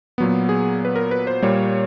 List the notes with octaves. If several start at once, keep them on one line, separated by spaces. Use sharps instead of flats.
A#2 F#3 B3
G#4
B4
A#4
B4
C5
A#2 G3 A#3 C#5